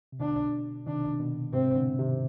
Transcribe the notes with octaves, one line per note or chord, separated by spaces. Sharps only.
C3
B2 D3 D4
C3 D#3 D4
B2
G#2 C3 C4
B2 D3
C3 D#3